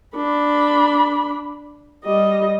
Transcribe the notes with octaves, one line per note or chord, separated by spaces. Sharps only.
D4 B5
G3 D#5